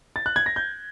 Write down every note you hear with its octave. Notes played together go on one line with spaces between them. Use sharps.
A6
F#6
G#6
A#6
G6